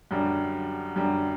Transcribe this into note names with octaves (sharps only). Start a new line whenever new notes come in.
F#2 D3 G3
F#2 D3 G3